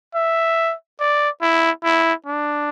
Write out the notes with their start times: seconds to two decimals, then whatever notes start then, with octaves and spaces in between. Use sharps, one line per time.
0.15 E5
1.00 D5
1.42 E4
1.84 E4
2.26 D4